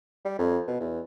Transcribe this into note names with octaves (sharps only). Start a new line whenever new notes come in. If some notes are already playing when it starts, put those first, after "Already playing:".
G3
F2
B2
E2